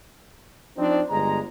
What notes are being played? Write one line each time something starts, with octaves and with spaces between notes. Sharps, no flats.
F3 C4 D4 D#4
G1 G#3 A#5